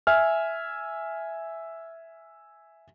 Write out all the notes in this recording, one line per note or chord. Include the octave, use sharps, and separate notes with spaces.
E5 G#5 F6